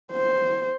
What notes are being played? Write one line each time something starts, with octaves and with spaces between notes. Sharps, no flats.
C5